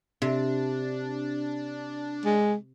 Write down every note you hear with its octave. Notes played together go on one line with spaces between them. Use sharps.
C3 D4
G#3